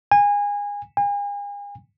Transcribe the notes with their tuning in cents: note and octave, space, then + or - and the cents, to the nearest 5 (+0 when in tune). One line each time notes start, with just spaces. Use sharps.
G#5 -25
G#5 -40